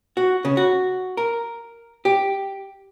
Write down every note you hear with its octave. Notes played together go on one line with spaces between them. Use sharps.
F#4
C#3
F#4
A#4
G4